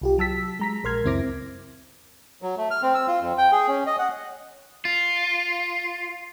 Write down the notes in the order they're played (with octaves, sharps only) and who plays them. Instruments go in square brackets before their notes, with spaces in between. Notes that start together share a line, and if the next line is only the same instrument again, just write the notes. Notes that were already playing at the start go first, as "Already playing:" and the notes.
[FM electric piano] C2 F4 G4
F#3 A5 E6 B6
G#3 A#5 B6
A#1 A#4 C6 F6 G#6
C#2 F#2 C4 E4 D6 A#6
[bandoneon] F#3
A3
F6
C4
E6
F4
F2
G5
G#4
C#4
D#5
F#5
[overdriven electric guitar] F4